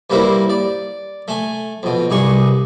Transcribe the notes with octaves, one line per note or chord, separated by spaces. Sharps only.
G2 G3 A#3 C4 E4
D5
A3 G#5
F2 B2
C2 G2 G#4 C#6